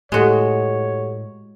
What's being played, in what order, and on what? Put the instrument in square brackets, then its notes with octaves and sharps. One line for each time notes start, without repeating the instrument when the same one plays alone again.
[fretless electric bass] A2 [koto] G#3 F#4 [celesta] G4 A4 F#5 [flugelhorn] C#5